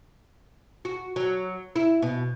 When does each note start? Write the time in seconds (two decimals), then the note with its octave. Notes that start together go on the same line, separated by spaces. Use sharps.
0.85 F#4
1.16 F#3
1.76 E4
2.02 B2